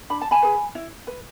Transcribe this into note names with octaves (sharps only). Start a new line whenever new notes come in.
D4 B5
A5
G#5 B5
G#4 B4
E4
B4